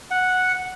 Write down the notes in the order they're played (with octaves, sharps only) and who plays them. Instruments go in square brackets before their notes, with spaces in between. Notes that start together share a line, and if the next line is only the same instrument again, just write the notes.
[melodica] F#5